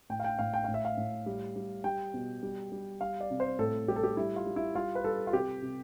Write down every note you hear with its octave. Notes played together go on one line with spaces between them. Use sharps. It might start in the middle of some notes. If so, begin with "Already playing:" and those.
A2 G5
F5
G5
A2 F5
G5
A2 F5
E5
F5
A2
G3
G3
G3 G5
B2
G3
G3
G3 F5
D5
C3
C5
A2 A4
G3 G4
A4
G4
G3 E4
F4
G3
E4
G3 F4
B4
G3 A4
F4
C3 G4
C3